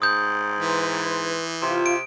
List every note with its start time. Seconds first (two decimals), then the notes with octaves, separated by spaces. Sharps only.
0.02 G#2 D#6 G6
0.61 E3 B4 C6
1.62 C3 F4
1.86 D7